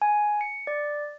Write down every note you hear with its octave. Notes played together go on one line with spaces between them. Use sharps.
G#5
C#7
D5